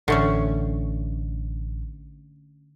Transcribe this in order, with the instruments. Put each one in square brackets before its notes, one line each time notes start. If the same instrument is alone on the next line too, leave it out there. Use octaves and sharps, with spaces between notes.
[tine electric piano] A1 [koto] D3 A3 C#4